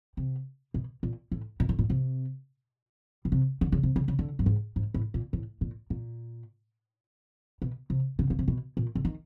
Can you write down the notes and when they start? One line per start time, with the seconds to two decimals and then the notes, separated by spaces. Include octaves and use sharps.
0.17 C3
0.74 B2
1.03 A#2
1.32 A2
1.60 A#2
1.69 A2
1.79 A#2
1.90 C3
3.25 B2
3.32 C3
3.61 D3
3.72 C#3
3.83 C3
3.96 C#3
4.08 C#3
4.19 D3
4.39 G2
4.46 G#2
4.76 G#2
4.94 A2
5.14 A#2
5.33 A2
5.61 A#2
5.90 A#2
7.62 B2
7.90 C3
8.19 C#3
8.30 C#3
8.39 C3
8.48 B2
8.77 A#2
8.95 D3
9.05 D#3